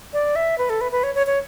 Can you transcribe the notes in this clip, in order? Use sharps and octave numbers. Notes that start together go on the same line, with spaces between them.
D5
E5
B4
A4
B4
B4
C#5
C#5
C#5